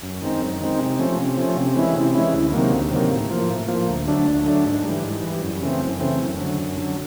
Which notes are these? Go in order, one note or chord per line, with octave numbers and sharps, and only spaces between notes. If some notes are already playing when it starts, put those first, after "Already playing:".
F#2
D#3 G#3 C4 D#4
F#2
D#3 G#3 C4 D#4
C3
F3 A3 C#4
C3
F3 A3 C#4
C3
E3 G#3 C#4 E4
C3
E3 G#3 C#4 E4
D2
C3 D#3 F#3 A#3
D2
C3 D#3 F#3 A#3
A2
F3 A#3
A2
F3 A#3
D2
D3 F#3 A3 D4
D2
D3 F#3 A3 D4
G#2
E3 G3
G#2
E3 G3
F#2
C#3 E3 A3 C4
F#2
C#3 E3 A3 C4
F#2
D3 F#3
F#2
D3 F#3